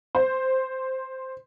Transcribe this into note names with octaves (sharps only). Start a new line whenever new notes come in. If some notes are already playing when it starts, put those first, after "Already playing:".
C5